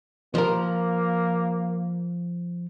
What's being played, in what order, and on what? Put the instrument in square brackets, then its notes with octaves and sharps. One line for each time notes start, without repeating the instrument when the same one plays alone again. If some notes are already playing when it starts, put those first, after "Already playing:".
[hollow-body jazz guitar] F3 A#4 [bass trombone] A#3